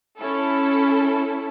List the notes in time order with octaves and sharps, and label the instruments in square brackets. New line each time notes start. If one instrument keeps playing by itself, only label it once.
[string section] C#4 E4 A4